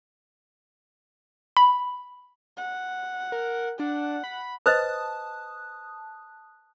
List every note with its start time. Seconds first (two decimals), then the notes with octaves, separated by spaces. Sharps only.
1.57 B5
2.57 F#5
3.32 A#4
3.79 D4 F#5
4.24 B5
4.66 B4 C5 D#5 A5 D#6 F#6